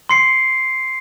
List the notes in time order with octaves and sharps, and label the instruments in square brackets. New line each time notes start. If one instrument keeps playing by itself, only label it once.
[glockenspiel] C6 C7 C#7